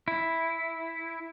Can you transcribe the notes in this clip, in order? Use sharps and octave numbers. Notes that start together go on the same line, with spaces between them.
E4